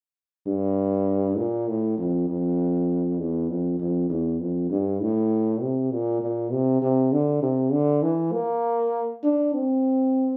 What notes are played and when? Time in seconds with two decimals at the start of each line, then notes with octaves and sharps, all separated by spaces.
0.47 G2
1.38 A#2
1.68 A2
1.98 F2
2.28 F2
3.19 E2
3.50 F2
3.80 F2
4.10 E2
4.40 F2
4.70 G2
5.01 A2
5.61 C3
5.91 A#2
6.22 A#2
6.52 C3
6.82 C3
7.12 D3
7.42 C3
7.72 D3
8.03 E3
8.33 A#3
9.24 D4
9.54 C4